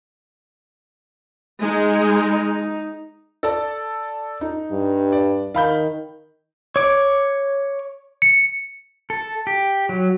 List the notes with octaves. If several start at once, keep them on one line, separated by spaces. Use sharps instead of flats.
G#3 D#4
A4 D5 A5
D#4
G2
D5
D#3 F5 B5 G6
C#5 D6
C#7
A4
G4
F#3